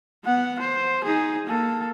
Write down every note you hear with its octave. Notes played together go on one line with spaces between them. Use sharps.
B3 F#5
C5
D#4 G#4
A#3 A4